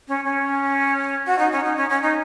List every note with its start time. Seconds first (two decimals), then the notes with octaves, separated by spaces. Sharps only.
0.08 C#4
0.25 C#4
1.26 F#4
1.39 D#4
1.52 C#4
1.64 D#4
1.77 C#4
1.90 C#4
2.02 D#4